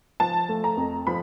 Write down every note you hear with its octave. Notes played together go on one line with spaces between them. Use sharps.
F3 A5
A3
A#5
F2
F3 B5